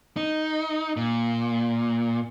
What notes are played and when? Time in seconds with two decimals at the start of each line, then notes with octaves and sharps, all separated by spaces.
0.17 D#4
0.96 A#2